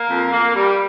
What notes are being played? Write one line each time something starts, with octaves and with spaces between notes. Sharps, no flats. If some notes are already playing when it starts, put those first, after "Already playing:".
Already playing: A#3
F2
A#3
G3